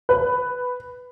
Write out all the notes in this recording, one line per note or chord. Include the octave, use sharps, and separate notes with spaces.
B4